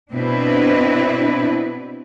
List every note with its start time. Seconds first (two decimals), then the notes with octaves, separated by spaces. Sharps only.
0.12 B2 C4 D4 E4 B4